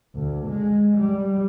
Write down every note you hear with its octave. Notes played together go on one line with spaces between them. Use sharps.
D2
G#3
G3